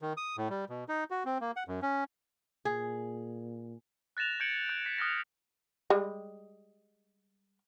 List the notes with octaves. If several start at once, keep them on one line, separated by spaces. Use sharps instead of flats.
D#3
D#6
A2
G3
B2
D#4
F#4
C4
A#3
F#5
F#2
C#4
A#2 G#4
F#6 A6 A#6 E7 F7
G6 G#6 C#7 D7 F#7
G6
G6 B6 D7
D#6 F6 F#6 A#6 B6
G3 G#3